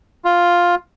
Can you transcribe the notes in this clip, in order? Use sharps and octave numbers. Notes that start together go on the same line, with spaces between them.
F4